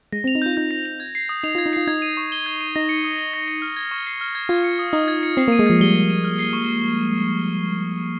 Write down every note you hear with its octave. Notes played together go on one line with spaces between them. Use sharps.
G#3 A#6
C4
F7
D#4
F4 G6
D#4 G6
A#6
F7
G#6
C7
D#6
D#4 F7
F4
G#6
D#4
F4 C7
D#4 G#6
D#7
C#6
G7
G#6
D#7
D#4 A#6
C#7
D#6
G7
A#6
C#7
F6
G#6
C#6
C7
F6
G#6
F4 G#6
C#7
D#6
D#4 D#6
G#6
C#7
C4 C7
A#3
D#7
G#3
F3 G#6
G3 G7
C7
D#7
F6
C7
C#6